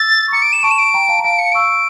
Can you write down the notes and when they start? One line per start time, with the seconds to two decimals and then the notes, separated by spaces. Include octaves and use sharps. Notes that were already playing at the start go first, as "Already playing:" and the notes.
Already playing: E6 A6
0.28 C#6
0.33 A#5 D6 C#7
0.42 D7
0.53 E7
0.63 A5 C#6 D7
0.71 E7
0.78 D7
0.94 G5 A#5
1.09 F5 A5
1.19 A#5
1.24 F5 A5 D7
1.39 C#7
1.52 C#6 E6 D7